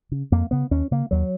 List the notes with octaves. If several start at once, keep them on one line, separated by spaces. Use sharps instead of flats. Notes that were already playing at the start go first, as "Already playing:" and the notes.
C#3
F2 A#3
C#3 B3
D#2 C#4
C#3 A#3
D#2 F#3